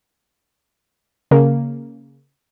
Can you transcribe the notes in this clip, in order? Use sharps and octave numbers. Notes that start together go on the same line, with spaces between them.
C#3 A#3